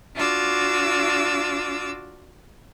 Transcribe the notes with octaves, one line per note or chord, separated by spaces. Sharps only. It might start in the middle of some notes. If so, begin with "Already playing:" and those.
D4 F4 F#4 D6 E6